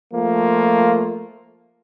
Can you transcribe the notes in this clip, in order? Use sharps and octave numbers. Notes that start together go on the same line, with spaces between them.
F3 A3 A#3 F4